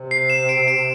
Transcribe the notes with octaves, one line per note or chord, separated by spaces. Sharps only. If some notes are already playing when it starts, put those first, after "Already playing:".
Already playing: C3
C7
E7
D7
D7